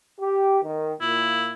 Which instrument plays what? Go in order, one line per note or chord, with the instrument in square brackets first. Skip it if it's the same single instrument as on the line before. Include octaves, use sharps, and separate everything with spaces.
[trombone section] G4
D#3
[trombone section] A#2 [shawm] E4